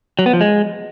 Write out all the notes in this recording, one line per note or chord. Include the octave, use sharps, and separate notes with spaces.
F#3
B3
F3
G#3